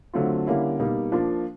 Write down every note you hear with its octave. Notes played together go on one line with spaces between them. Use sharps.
D3 F#3 A3 C4 F4
D3 G3 A#3 C#4 E4
B2 G3 A#3 D#4
F3 A#3 D4 F4